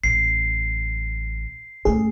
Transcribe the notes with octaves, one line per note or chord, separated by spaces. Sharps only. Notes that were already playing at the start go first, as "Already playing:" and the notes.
A1 F#3 C7
F#2 A3 G#4